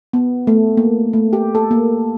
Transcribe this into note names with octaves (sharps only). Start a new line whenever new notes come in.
B3
A3
A#3
A3
G4
A4
A#3